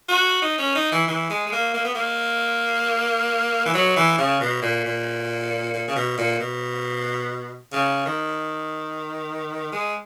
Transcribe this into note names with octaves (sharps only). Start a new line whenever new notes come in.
F#4
D#4
C#4
D#4
E3
E3
G#3
G#3
A#3
A#3
B3
A#3
E3
F#3
E3
C#3
B2
A#2
A#2
A#2
C#3
B2
A#2
B2
C#3
D#3
G#3